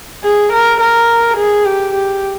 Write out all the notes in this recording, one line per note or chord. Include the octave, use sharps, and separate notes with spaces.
G#4
A#4
A#4
G#4
G4
G4